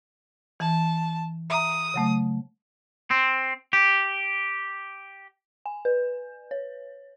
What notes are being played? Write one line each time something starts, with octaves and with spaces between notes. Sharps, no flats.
E3 A5
E5 A#5 D#6
C#3 F#3 A3
C4
G4
G#5
B4
C#5